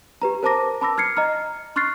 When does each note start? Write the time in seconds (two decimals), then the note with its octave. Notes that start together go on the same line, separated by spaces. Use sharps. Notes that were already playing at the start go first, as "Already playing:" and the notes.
0.22 G4 B4 A#5
0.43 A#4 C5 A5 A#5 D6 A#6
0.81 A5 B5 D6 E6 A#6
0.98 F6 G#6 C7 C#7
1.17 D#5 A#5 F6
1.76 C6 C#6 F6 F#6 A6 C7